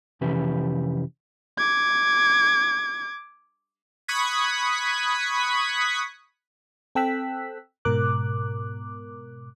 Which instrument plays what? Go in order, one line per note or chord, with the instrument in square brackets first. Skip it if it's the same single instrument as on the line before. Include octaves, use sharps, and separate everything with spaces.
[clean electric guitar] F2 C3 E3 C#4 G4 B4
[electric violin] D6 G#6
[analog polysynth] B5 C#6 D#6 F#6 G#6 B6
[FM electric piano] C4 A4 G5 E6 F#6 B6
G#2 B2 A#4 D6 F#6